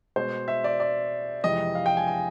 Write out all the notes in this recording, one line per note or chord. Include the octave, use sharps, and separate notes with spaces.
B2 G#3 C5
E5
D5
D5
F2 C3 E3 G#3 D#5
F5
G5
G#5
G#5